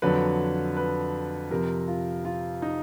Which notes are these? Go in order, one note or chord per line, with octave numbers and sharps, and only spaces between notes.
F2 D3 F#3 B4
B4
F2 C3 F3 A#4
F4
F4
D#4